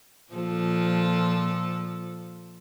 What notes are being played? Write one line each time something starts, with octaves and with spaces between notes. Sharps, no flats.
A#2 F3 A4